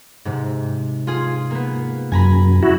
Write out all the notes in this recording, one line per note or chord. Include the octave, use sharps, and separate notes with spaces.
G#2 C3
F4 G#4
A#3 B3
F#2 G#5 A#5 B5
E4 F#4